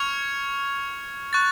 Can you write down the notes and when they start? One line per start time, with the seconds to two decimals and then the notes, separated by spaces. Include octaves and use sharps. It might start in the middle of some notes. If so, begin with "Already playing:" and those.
Already playing: C#6 F6 G#6 C#7 F7
1.33 C#6 F#6 A6